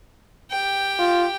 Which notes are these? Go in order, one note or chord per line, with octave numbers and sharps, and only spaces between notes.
G4 G5
F4